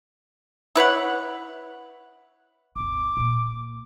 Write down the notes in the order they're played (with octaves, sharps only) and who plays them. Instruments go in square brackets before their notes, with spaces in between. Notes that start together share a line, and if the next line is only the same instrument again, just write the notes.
[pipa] E4 B4 C#5 F#5
[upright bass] G#1 D#2 [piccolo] D6
[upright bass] A#2 A#3